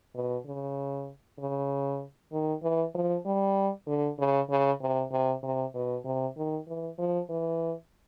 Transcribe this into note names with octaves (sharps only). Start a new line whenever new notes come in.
B2
C#3
C#3
D#3
E3
F3
G3
D3
C#3
C#3
C3
C3
C3
B2
C3
D#3
E3
F3
E3